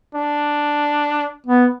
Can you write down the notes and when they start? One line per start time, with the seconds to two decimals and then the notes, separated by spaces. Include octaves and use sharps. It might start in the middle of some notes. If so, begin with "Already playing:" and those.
0.15 D4
1.47 B3